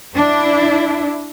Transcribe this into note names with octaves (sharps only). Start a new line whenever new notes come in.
D4 E4